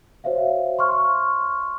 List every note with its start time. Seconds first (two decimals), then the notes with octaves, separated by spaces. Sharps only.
0.24 F#4 C5 C#5 E5 F5
0.79 C6 C#6 F6